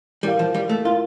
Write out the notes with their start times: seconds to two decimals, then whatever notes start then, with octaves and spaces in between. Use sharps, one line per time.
0.23 G3 E4 A#4 F5
0.39 F3
0.54 G3
0.69 A3
0.85 E4 F4 A#4 F5